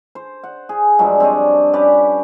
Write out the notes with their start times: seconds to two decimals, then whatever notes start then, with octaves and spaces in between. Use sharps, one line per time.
0.15 C5
0.44 F#5
0.69 G#4
0.99 G2 F3 F#3 G#3
1.20 C4 D4 C#5 D#5
1.73 C#4 G4 B4 D5